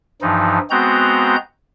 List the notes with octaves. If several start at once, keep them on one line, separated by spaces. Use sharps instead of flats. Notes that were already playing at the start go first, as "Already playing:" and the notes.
G2 E3 F3 D#4
G#3 B3 C4 F#4 A#5 G6